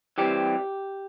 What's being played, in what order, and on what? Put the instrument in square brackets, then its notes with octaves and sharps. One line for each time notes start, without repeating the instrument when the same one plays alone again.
[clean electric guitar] E3 G3 C4 G4